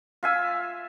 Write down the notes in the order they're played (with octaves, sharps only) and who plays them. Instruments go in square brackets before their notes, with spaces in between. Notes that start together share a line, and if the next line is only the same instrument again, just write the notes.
[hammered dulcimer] F4 E5 G#5